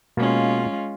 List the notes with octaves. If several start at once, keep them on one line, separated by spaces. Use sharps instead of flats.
B2 G#3 A#3 B3 C#4 F4